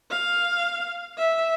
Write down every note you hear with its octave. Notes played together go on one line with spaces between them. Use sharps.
F5
E5